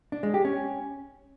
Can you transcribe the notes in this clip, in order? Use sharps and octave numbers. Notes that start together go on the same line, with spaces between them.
D4
G#3
G4
C#4